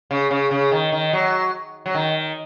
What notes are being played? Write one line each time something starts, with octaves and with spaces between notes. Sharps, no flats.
C#3
C#3
C#3
D#3
D#3
F#3
F#3
D#3